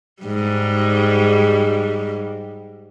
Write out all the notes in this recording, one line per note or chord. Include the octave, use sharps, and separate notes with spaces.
G#2 G3